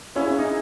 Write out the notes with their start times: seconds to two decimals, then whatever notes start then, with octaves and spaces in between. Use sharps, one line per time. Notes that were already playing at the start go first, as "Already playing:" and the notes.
0.15 E3 A#3 C#4 E4 G#4
0.27 C#4
0.39 D#4